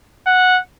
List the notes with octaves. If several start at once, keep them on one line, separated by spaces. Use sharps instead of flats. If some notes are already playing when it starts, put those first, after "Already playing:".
F#5